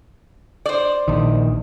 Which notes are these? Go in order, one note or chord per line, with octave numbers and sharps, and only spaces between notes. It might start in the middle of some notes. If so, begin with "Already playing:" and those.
C5 D5
A#1 D#3